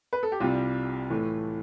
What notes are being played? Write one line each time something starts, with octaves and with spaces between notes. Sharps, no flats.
B4
A4
G4
C2 C3 G3 F4
A2 E3 A3